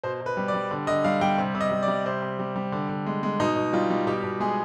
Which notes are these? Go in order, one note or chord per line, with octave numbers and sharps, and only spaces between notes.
B2 C5
B2
B4
G3
D5
G3
D3
D3 D#5
G3 F5
G3 G5
C3
C3
D#5
G3
D5
G3
C3 C5
C3
G3
G3
D3
D3
G#3
G#3
B2 D#4
B2
G3 F4
G3
B2 G4
B2
G#3 G#4